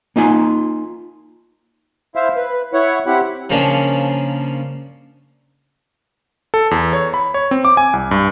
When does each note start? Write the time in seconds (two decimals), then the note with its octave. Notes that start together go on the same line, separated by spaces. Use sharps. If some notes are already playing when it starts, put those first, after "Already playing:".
0.16 A#3 D#4 F4 G#5
2.16 E4 C5 E5 F5
2.36 B4
2.73 E4 C#5 F#5
3.06 C4 E4 G4 F#5 B5
3.50 C#3 F3 A#3 C#4 D4
6.54 A4
6.71 E2
6.93 C#5
7.14 B5
7.34 C#5
7.51 C4
7.65 D6
7.77 G#5
7.93 C2
8.11 G2